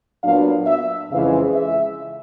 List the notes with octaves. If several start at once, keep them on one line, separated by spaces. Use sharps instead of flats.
A#2 F#3 B3 D4 F5
E5
F2 C#3 E3 G#3 F5
E5